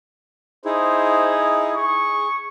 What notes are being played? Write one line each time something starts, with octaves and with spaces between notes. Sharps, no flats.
D#4 E4 G#4 C5
G#4 C#6